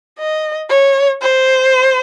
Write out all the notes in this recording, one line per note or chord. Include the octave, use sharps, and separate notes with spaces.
D#5
C#5
C5